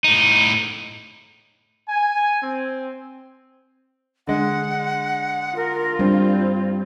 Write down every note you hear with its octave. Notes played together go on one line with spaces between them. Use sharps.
A2 D#4
G#5
C4
D3 G#3 F#5
F4 A#4
G2 G3 C4